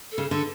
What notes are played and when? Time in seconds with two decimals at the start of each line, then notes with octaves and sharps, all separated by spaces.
0.12 A4
0.18 C#3
0.30 D3 A4